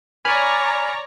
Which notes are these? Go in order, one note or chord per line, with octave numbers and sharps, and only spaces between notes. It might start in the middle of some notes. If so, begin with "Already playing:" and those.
C#5 D5 G#5 A#5 B5 F6